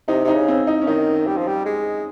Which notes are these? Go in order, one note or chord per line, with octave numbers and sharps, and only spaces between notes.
C3 D#4
C3 D#4
C#3
C4
D#4
C#4
D#3 D#4
G3
F3
G3
G#3